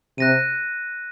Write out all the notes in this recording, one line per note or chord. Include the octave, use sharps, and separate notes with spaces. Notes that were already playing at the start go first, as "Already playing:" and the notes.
C3 F#6 A#6 D#7